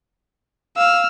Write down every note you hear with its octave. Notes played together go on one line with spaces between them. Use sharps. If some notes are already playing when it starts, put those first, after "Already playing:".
F5 E6 F6